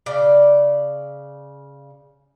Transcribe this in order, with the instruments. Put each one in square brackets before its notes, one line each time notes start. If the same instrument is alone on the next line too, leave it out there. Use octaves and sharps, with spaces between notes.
[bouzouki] C#3 D5